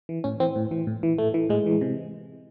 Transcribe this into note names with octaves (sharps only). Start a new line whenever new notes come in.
E3
A2 C#4
E3 C4
A2
E3
A2
E3
A2 A3
E3
A2 G#3
E3
C3